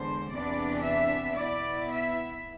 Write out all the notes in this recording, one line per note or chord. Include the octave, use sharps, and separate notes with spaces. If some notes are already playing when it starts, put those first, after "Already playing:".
Already playing: E2 D3 G#3 C5
E2 C3 E3 B3 D4 D5
E5
B2 B3 E4 D5
E5